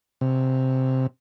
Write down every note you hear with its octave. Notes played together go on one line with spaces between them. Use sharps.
C3